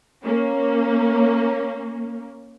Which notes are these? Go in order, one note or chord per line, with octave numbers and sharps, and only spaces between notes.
A#3 C#4